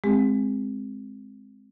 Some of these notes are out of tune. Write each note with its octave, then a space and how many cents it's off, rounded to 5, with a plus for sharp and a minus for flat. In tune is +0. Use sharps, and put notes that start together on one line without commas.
G#3 +0 C4 +0 G4 +45